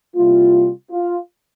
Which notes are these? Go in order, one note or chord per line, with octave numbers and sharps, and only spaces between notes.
C3 G3 A#3 E4 F4
F4